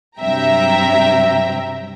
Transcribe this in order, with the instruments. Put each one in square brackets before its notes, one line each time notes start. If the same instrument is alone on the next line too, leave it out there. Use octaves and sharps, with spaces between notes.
[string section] G2 C3 F#3 E5 G5 A#5